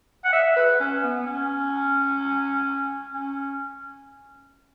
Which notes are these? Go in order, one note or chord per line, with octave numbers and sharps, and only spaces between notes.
F#5
E5
B4
C#4
B3
C#4
C#4